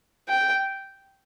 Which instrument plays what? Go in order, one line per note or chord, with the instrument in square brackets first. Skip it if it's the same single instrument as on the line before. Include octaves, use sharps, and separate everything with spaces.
[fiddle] G5